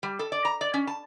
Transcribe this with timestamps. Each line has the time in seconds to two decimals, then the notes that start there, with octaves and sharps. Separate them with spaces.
0.03 G3
0.19 A4
0.32 D5
0.45 A#5
0.61 D5
0.74 C#4
0.87 A5